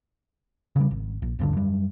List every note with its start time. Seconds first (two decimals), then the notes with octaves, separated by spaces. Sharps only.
0.76 C#3 E3 G3
0.91 G#1
1.22 A#1
1.39 D#1 A#1 G2 D3
1.53 F#2 G3